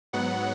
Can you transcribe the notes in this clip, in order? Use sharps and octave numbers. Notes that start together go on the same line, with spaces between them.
G#2 F#3 B3 F#5